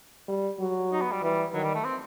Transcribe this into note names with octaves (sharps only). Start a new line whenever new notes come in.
G3
F#3
D#4
B3
G3
E3 G3
D#3 F#3
G3
A3
C4